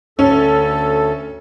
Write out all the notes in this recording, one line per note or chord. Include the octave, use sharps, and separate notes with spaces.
D2 C#4 A4